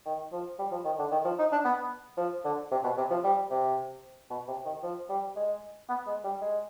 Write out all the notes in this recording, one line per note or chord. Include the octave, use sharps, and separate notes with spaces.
D#3
F3
G3
F3
D#3
D3
D#3
F3
D#4
D4
B3
F3
D3
C3
B2
C3
F3
G3
C3
B2
C3
D#3
F3
G3
G#3
B3
G#3
G3
G#3